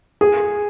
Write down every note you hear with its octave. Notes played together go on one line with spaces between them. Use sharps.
G#4